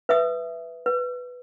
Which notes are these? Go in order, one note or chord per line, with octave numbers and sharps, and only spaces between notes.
B4 E5 D#6
B4